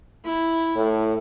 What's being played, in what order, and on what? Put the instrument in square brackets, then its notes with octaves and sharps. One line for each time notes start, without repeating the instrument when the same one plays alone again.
[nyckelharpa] E4
[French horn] A2